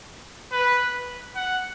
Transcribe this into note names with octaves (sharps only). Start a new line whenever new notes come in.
B4
F#5